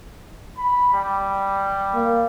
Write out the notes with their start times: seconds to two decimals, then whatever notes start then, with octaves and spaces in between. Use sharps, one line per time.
0.58 B5
0.93 G3
1.94 A#3